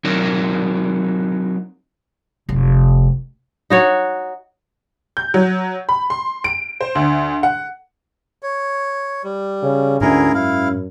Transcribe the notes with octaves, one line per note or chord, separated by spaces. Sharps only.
F#3 C4 D#4 F#4 A#4
F1
D#4 F#4 C#5
G6
F#3
B5
C6
D7
C5
D2
F#5
C#5
G3
C#3
D2 G#2 C#4 E4 G#4 A#4
F#2 E4 F5